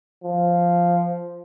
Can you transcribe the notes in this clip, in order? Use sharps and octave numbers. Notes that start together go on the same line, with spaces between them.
F3